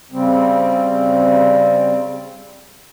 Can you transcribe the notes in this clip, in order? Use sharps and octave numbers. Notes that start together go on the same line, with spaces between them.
C#3 G3 C4